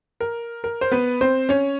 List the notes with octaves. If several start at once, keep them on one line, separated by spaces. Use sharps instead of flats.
A#4
A#4
C5
B3 B4
C4 C5
C#4 C#5